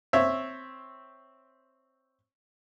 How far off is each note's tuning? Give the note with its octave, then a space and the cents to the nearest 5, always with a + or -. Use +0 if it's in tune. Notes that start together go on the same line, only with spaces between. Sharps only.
C4 +0 C#5 -5 E5 +0